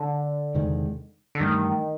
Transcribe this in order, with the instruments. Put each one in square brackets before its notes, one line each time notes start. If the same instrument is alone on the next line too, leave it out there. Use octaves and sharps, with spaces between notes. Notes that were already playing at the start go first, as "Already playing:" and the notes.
Already playing: [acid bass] D3
[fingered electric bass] E2 C3 D#3 G#3
[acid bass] D3
[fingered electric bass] G2 E3 A3 [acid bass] D#3